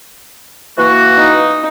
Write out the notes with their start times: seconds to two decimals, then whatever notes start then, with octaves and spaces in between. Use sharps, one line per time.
0.78 E3 A#3 F#4
1.18 D#4